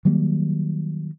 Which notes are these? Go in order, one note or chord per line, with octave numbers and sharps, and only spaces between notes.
D#3 F#3 G3 A#3